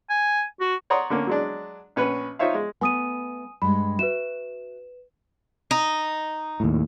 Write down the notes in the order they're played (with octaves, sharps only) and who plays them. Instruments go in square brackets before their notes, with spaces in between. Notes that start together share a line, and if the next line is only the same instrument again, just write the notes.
[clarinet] G#5
F#4
[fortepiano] C#5 D5 F#5 A#5 C6 D#6
D3 A#3 C#4
F#3 G#3 D4
A#1 C#4 B4 C#5
D#4 F4 C5 C#5 E5 F5
G#3
[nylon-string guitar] A3 B3 [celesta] G#5 D#6 D#7
[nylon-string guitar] G2 G#3 [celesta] B5
[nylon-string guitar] F#4 E5 [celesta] B4 E7
[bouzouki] D#4
[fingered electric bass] D#2 A2